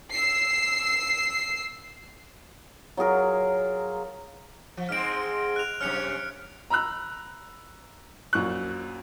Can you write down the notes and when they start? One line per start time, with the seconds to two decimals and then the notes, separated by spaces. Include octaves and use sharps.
0.12 E6 C7
2.97 F#3 F4 G#4 A#4
4.77 F3
4.89 G#2 G#3 C4 F6 D7
5.56 F#6 F7
5.81 F#2 C3 C#4 F6 C#7 F7
6.70 A#5 B5 E6 F#6
8.33 A#1 F#2 C#6 F#6